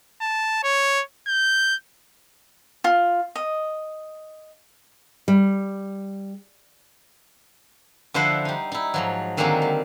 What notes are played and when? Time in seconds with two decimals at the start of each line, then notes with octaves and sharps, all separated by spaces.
0.21 A5
0.64 C#5
1.27 G6
2.84 F4
3.36 D#5
5.28 G3
8.14 D3 F3 E4 C5 E5 F#5
8.45 G3 D#4
8.72 D#4 E4
8.94 G#2 F3 F#3
9.37 D3 D#3 F#3 G#3 A#3 C4
9.62 G3